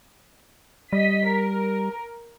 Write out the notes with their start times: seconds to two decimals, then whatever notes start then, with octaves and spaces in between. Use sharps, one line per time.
0.93 G3 D#5 B6
1.27 A#4